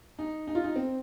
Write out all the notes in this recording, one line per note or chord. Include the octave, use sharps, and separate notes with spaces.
D#4
D#4
F4
D#4
C4